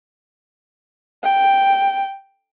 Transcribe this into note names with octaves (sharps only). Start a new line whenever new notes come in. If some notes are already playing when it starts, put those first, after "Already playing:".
G5